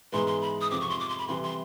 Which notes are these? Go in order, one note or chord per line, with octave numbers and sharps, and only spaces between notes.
G#2 E3 G#3 B3 C6
C6
B5
D#6
F2 C3 F3 D6
C#6
C6
D6
C6
B5
C3 E3 G3 C6
C6